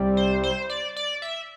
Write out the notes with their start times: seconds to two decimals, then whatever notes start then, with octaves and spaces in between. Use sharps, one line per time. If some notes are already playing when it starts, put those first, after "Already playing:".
Already playing: C2 C3 G3 C4
0.17 C5
0.44 C5
0.70 D5
0.96 D5
1.22 E5